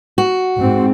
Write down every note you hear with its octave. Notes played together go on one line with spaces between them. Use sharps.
F#4
G#2 C4